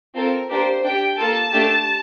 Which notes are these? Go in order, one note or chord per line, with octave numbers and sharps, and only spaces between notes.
C4 F4 A4 A#4
A#3 D4 G4 C5
D4 G4 G5
A#3 F4 A4 A5
A3 D4 G4